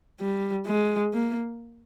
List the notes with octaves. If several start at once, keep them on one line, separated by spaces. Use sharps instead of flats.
G3
G#3
A#3